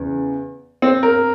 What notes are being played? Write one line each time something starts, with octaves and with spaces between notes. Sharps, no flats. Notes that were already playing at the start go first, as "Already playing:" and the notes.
Already playing: E2 C#3
C4
A#4